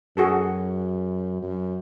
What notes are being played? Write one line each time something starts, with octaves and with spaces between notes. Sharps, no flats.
F#2 F#4 G#4 A4
F#2